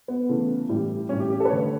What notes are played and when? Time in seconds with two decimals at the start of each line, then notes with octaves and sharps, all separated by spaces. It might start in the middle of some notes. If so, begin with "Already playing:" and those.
0.08 B3
0.29 C#3 E3 A3
0.69 A2 E3 G3
1.09 A2 E3 G3 C#4
1.20 G4
1.30 G4
1.40 A4
1.45 B4
1.50 D3 A3 C#5